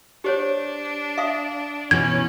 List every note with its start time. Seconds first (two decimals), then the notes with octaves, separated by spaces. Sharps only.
0.24 D4 G4 C5 C#5
1.18 E5 F5 D#6
1.91 B2 E3 C#4 G#6